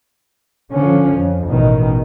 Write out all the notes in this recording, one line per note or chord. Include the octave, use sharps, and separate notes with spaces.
D3 F3 C#4
F2
A1 B2 D#3